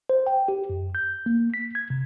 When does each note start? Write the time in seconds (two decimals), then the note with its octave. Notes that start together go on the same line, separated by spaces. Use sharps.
0.10 C5
0.27 G5
0.48 G4
0.70 F#2
0.95 G6
1.26 A#3
1.54 B6
1.75 G#6
1.90 C3